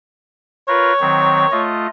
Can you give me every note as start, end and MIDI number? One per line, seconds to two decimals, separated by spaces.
0.68 0.93 65
0.68 0.93 70
0.68 0.93 71
0.68 1.70 73
1.00 1.46 51
1.00 1.46 54
1.00 1.46 60
1.52 1.87 57
1.52 1.87 65
1.52 1.87 75